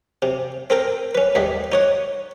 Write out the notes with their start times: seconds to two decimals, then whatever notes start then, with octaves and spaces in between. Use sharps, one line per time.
0.22 C3
0.70 C4 A4 A#4 G5
1.15 C#4 B4
1.35 D#2 G#2 G3 A3
1.72 D#4 C#5 F#5